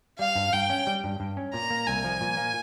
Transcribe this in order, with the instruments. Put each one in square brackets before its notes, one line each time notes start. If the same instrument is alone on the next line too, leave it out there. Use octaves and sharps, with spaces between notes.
[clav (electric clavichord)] G3 [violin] F5
[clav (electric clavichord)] G2
[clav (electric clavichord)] G2 [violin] G5
[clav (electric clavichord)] C#4
G3
G2
G2
C#4
[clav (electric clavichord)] A#2 [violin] A#5
[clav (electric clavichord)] A#3
[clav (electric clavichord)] C2 [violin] G#5
[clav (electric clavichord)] F3
A#2
A#3